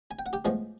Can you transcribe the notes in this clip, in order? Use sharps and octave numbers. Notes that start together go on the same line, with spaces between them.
G#5
G5
F#5
G4 G5
A2 F3 G#3 B3